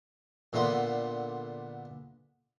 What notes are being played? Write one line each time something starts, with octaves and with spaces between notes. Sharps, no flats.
A#2 D3 B3 E5 C6